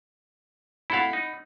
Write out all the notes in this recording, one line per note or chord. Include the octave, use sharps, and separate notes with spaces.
E4 A4 F5 F#5 B5
D#4